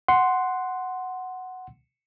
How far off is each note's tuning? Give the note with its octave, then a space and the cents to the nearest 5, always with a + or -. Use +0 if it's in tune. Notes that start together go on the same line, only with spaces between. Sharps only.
F#5 +0 C6 +0